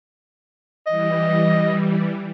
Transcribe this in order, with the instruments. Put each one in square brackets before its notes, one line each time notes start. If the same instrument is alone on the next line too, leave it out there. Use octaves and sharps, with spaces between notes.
[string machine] E3 G3 [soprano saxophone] D#5